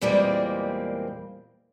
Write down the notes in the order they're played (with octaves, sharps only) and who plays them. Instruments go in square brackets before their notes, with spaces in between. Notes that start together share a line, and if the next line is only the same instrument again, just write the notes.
[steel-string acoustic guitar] E2 A#2 G3 G#3 A#3 C4